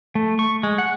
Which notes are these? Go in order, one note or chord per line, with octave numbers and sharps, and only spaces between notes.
A3
C#6
G#3
F#5